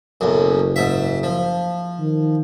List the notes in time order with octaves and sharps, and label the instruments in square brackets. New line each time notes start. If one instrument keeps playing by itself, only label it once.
[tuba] F#1 [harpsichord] B1 F#2
[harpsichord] G#2 E5
F3
[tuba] D#3